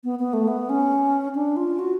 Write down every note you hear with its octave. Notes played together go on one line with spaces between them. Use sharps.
B3
B3
A3
B3
C#4
D4
F4
F#4